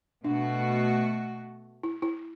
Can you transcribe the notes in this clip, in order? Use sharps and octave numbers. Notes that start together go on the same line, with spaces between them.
B2 A3 D4 F#4
E4
E4